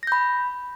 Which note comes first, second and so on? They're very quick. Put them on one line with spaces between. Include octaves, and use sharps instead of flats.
A#6 G6 B5